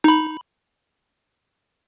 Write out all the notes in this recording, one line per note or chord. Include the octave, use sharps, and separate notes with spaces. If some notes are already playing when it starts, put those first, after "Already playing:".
D#4 B5